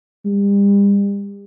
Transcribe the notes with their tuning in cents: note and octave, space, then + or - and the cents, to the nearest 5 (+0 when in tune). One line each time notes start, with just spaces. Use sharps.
G3 +40